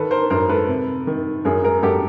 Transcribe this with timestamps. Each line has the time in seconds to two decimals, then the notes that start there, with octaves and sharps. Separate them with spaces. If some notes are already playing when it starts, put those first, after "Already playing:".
Already playing: D#3 A4 B4
0.11 A#4 C5
0.30 F#2 A#4 C5
0.49 A4 B4
0.69 C3
1.07 D#3
1.45 F#2 G#4 A#4
1.64 G#4 A#4
1.83 F#2 G4 A4